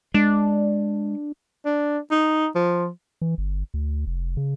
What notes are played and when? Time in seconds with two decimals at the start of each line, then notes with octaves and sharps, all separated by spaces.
0.14 G#3 D4
1.65 D4
2.11 D#4
2.55 F3
3.22 E3
3.38 G1
3.74 D2
4.07 F1
4.37 C#3